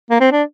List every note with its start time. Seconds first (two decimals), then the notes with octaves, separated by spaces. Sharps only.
0.10 A#3
0.20 C4
0.32 D4